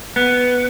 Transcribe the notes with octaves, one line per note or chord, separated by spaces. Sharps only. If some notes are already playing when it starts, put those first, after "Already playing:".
B3